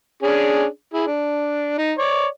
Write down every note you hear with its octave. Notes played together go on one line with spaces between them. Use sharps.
C#4 D4 G#4
E4 G#4
D4
D#4
C#5 D5